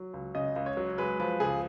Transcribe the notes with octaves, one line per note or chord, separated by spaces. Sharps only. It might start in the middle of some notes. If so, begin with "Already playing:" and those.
Already playing: F#3
C#2
C#3 D#5
C#2
C#5
F#3
G#3 B4
F3 B4
C#2 G#4